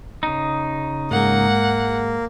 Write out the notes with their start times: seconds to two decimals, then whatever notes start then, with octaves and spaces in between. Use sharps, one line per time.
0.23 C#3 D#4
1.11 G#2 G#3 A#3 F#5